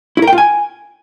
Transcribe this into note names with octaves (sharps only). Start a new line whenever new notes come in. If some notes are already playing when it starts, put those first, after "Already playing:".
E4
A#4
G5
F4
G#5